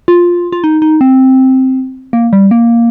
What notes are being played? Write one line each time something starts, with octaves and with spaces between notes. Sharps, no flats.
F4
F4
D#4
D#4
C4
A#3
G3
A#3